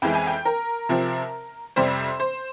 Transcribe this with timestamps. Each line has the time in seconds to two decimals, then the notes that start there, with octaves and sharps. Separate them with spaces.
0.02 F2 E3 G#3 E4 G5
0.15 G#5
0.27 G5
0.45 A#4
0.89 C3 F3 C4
1.76 F2 C3 G3 C4 C5
2.20 C5